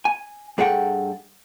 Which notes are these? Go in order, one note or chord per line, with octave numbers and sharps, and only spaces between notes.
G#5
G2 G#4 A4 F#5 G5